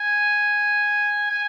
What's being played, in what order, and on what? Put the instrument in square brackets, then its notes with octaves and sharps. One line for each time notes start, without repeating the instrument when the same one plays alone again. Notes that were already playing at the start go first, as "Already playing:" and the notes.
Already playing: [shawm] G#5
G#5